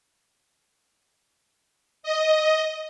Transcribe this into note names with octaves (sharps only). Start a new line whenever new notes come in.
D#5